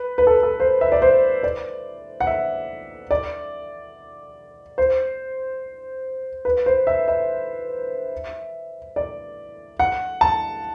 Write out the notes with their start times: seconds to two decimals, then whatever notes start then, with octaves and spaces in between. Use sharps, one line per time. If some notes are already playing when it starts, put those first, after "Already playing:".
Already playing: B4
0.18 B4
0.27 A4
0.43 A4
0.60 C5
0.81 E5
0.92 D5
1.02 C5
1.43 D5
2.20 F#5
2.27 E5
3.11 D5
4.78 C5
6.45 B4
6.66 C5
6.87 E5
7.08 E5
8.96 D5
9.80 F#5
10.21 A5